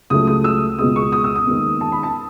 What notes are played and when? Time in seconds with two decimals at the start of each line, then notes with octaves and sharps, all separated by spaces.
0.10 C#2 C#3 F#3 A3 C#4 D#6
0.27 D#6
0.44 E6
0.78 C#2 B2 G#3 B3 D#6
0.96 C#6
1.12 D#6
1.24 E6
1.35 D#6
1.47 D#2 D#3 G#3 B3
1.81 A5
1.92 B5
2.03 A5